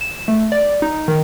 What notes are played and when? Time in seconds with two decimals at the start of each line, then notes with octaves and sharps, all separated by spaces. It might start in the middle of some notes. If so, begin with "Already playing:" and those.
0.01 E7
0.28 A3
0.52 D5
0.82 D#4
1.08 D#3